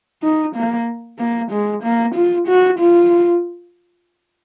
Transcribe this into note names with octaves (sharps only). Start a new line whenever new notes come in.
D#4
A#3
A#3
G#3
A#3
F4
F#4
F4